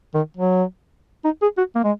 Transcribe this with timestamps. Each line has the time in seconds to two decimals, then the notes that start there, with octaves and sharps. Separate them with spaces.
0.15 D#3
0.37 F#3
1.25 D#4
1.42 G#4
1.58 F#4
1.75 A#3
1.84 G#3